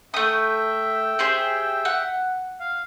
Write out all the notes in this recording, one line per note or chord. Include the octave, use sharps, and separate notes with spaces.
A3 E5 G5 D#6
G4 G#4 C5
F#5
F5